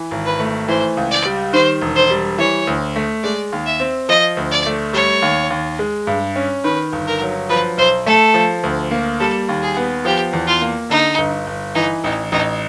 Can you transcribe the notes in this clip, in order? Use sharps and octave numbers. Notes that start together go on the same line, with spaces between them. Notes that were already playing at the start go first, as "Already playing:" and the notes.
Already playing: E3
G#1
B4
A3
E3 C5
C#2
D5
G3
D#3 C5
E1
C5
G3
E3 C#5
D2
A3
G#3 D5
D#2
E5
C4
F3 D#5
D2
D5
A3
G3 C#5
D#2
D#2
G#3
G2
C#4
D#3 B4
G1
A#4
F#3
F3 B4
B1 C5
A3 A4
F3
D2
A#3
G3 A4
D#2
G#4
B3
F3 G4
E2
F4
A#3
D3 D#4
G1
G1
E3 D#4
A1 D#4
A1 D#4